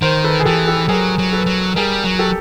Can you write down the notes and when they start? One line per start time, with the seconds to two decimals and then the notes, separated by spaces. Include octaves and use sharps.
0.02 D#3 A#4 C5
0.24 A4 B4
0.40 G#4
0.45 E3 G4 A4
0.67 G4 A4
0.88 F#3 G#4 A#4
1.18 F#3
1.33 A4 B4
1.46 F#3
1.76 G3 G#4 A#4
2.04 F#3
2.19 G4 A4